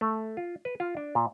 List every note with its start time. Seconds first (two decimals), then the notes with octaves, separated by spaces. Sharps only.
0.01 A3
0.37 F4
0.65 B4
0.80 F4
0.97 D4
1.15 A#2